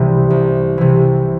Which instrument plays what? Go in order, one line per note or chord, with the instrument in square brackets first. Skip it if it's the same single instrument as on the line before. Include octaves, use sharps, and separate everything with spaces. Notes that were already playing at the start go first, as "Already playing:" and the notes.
Already playing: [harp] C2 C3 E3 B4 D5
C2
C3 E3